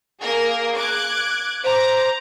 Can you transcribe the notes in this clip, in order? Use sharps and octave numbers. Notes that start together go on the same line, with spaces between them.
A#3 G#4 A#4
D6 F#6 G#6
C5 A#5 D6